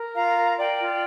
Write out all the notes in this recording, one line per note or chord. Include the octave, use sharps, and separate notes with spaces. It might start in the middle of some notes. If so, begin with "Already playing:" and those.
Already playing: A#4
F4 F5 A#5
A#4
A#4 D5 G5
F4